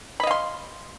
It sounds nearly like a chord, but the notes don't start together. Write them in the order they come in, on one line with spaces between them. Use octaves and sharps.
B5 D#5 F5 C6